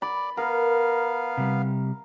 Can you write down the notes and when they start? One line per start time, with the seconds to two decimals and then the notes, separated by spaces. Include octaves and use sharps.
0.02 D5 B5
0.37 B3 A#4 F5
1.37 C3 G3